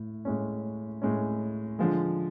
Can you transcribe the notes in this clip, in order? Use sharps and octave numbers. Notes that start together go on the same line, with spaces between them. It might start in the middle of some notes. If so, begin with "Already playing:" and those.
Already playing: A2
A2 G#3 C#4
A2 G#3 C#4
D3 F3 G#3